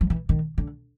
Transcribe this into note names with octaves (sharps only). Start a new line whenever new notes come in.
F3
E3
D#3
D3